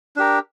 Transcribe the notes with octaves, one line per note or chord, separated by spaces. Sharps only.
D4 G4 A#4